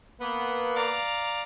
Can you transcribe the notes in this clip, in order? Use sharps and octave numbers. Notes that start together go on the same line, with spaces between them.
A#3 B3
D5 F5 A#5